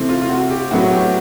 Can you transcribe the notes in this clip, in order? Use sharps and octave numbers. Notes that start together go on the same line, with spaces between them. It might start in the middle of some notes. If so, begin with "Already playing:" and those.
Already playing: C3 E3 A3 C4
F4
F4
F#4
G4
A2 F#3 B3 F#4
G4